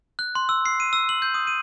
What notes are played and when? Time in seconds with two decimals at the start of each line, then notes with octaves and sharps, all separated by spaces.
0.19 F#6
0.35 C6
0.49 E6
0.66 C7
0.80 D#7
0.93 E6
1.09 F#7
1.22 G6
1.34 D#6
1.47 D#7